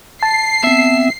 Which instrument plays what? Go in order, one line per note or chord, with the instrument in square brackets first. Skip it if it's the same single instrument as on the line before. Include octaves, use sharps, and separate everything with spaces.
[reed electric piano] A5 [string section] C7
[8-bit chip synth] B3 C4 [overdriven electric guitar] E5